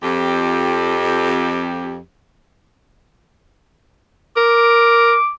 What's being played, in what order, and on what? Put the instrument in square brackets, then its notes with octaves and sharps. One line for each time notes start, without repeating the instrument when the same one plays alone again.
[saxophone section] F2 G4
[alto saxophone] A#4 [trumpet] D6